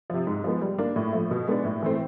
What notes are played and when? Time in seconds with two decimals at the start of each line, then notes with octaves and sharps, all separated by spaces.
0.10 C3 F3
0.27 G#2
0.44 F3 G#3 B3
0.61 G3
0.78 A#3 D4
0.96 A2
1.13 F3 A3
1.31 B2
1.48 G#3 B3 D4
1.65 A2
1.82 E3 A3 C4